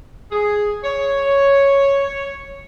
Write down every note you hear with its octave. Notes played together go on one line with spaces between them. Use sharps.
G#4
C#5